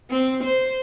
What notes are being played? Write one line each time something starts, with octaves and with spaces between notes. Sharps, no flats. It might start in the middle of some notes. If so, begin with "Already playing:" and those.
C4
C5